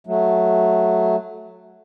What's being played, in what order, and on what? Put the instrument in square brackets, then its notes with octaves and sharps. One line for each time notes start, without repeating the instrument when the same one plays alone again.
[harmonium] F#3 A3